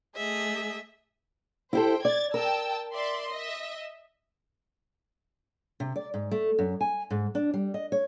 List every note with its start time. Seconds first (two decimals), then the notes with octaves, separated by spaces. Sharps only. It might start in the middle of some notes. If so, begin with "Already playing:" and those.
0.17 A3 G#4 D#5 E5
1.73 E4 G4 A4 C5 G5
2.05 D5 G#6 A6
2.34 A#4 G5 A5 E6
2.94 D5 E5 C6
3.32 D#5 E5
5.80 C3
5.96 D5
6.14 G#2
6.31 A3
6.59 F#2
6.81 G#5
7.10 G#2
7.35 D4
7.54 G3
7.74 D#5
7.92 C#5